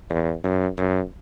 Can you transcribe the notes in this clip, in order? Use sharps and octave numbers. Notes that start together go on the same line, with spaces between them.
E2
F#2
F#2